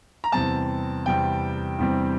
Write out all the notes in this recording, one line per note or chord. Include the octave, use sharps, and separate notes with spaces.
A#5
E2 C3 G3 C4 A5
E2 C3 G3 C4 G5
E2 C3 G3 C4